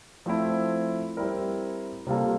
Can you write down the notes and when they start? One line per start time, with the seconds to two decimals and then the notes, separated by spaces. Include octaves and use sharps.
0.26 F3 A3 C4 E4
1.17 G3 C4 E4 A#4
2.07 C3 G3 A#3 F4 A4